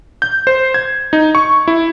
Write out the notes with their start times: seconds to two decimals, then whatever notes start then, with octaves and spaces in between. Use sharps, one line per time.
0.22 G6
0.47 C5
0.74 G#6
1.13 D#4
1.35 C#6
1.68 E4